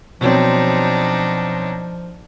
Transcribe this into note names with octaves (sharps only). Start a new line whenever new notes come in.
B2 F3 F#3 C4 D4 D#4